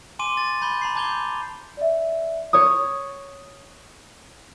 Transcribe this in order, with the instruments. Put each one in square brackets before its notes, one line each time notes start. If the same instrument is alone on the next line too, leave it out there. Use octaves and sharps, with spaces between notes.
[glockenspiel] G#5 C6 D6 D#7
A6
B5 G6 D#7 G7
A#5 B5 C7
A5 D6 G6 G#6 F7 G7
G6
[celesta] D5 E5
[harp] C#5 D#6